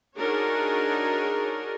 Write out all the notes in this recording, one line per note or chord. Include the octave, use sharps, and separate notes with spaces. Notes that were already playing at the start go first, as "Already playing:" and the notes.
D4 D#4 F#4 G#4 A#4 C#5